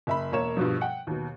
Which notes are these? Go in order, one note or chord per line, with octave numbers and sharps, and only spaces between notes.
F#1 E5 B5
E1 A#3 C#5 E7
G2 B2 F3
F#5 G5
D#2 B2